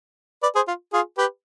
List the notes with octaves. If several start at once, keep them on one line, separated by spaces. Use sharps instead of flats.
B4 D5
G#4 C5
F4
F4 G#4
G4 B4